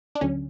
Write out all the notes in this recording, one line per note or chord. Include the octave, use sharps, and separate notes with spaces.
D4
D2 D3 F#3 C#4